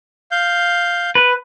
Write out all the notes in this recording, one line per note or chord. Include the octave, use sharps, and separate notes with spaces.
F5 G6
B4